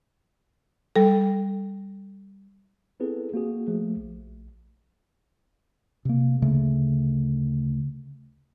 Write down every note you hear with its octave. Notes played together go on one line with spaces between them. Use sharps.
G3 A4
B3 C4 E4 G#4 A4 B4
A#3 F#4 G#4
F3 A3
A#1
C3 A#3
D2 C#3 A3